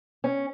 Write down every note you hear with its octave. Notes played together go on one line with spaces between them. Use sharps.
C#4